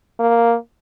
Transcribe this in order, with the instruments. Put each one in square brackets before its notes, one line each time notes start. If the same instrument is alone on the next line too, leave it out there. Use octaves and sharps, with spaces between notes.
[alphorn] A#3